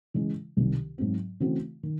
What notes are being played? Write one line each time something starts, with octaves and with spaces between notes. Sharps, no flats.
C#3 E3 G#3
C2 C3 D#3
G#2 F#3 C4
C#3 E3 A3 C4 F#4
D#3